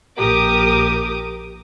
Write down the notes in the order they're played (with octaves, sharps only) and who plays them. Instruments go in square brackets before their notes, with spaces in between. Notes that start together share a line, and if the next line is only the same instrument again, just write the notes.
[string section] A#1 G4 A#4 D6 D#6